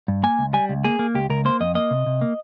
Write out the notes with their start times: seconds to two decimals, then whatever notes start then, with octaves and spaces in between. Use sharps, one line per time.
0.08 G2
0.23 A#3 G#5
0.39 C#2
0.54 G3 G#5
0.69 C#2
0.84 A#3 G#4
0.99 A#3
1.15 C#2 G4
1.30 C#2 A#4
1.45 A#3 C5
1.60 F2 D#5
1.75 A#3 D#5
1.91 C3
2.06 C3
2.21 A#3